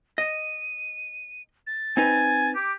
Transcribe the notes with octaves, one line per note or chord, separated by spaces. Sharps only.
D#5 D#7
A6
C4 D#4 B4 G#5
G4 D6